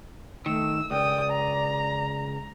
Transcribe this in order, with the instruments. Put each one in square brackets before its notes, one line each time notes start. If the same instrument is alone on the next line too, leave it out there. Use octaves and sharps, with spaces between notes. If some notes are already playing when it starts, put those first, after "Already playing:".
[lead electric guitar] D#3 [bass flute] A3 [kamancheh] E6
[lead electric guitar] C#2 [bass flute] D5 [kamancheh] G5 D#6
[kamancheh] A#5